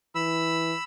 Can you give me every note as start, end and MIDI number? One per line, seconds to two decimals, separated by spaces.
0.15 0.73 52
0.15 0.84 83
0.15 0.84 88